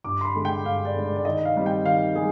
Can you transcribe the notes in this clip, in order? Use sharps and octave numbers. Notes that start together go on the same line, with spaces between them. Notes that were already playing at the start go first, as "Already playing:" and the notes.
G2 D6
C6
B5
D3 G#3
G5
G2 F5
D5
D3 G#3
D5
D5
D#3 D#5
F5
G3 C4
G5
D#3 F5
G3 G#4